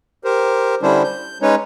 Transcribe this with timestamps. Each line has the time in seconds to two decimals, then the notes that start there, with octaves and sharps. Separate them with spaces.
0.24 G4 A#4 C5
0.82 D3 G3 C#4 D4 E4 C5
1.04 G6
1.42 G#3 C#4 D#4 B4 C#5